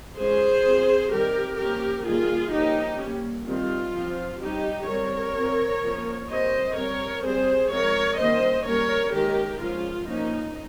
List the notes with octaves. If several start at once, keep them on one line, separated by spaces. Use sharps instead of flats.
F3 G#3 C#4 G#4 C5
F3 C4
D#3 G3 C4 G4 A#4
F3 A#3 C#4 G4 A#4
D#3 G3 A#3 F4 G#4
F3 A#3 C#4 D#4 G4
G3 A#3 C#4
D#3 G3 C4 F4
F3 C4
G3 C#4 D#4 G4
G3 C4 A#4 C#5
F3 C4
F3 A#3 C#4
G3 C4 C5 D#5
G3 C4 A#4 C#5
G3 C4 G#4 C5
F3 G#3 C4 A#4 C#5
D#3 G3 A#3 C#4 C5 D#5
G3 A#3 C#4 A#4 C#5
D#3 G#3 C#4 G4 A#4
F3 G#3 C#4 F4
F3 A#3 C#4 D#4